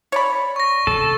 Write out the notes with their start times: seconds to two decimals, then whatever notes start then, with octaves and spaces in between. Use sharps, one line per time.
0.12 C#5 D5 B5
0.56 C#6 A#6
0.87 C3 A4